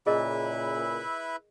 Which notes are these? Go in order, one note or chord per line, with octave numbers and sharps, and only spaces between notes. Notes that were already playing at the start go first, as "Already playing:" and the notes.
A#2 C#3 E4 G#4 A#4 B4 D#5 E5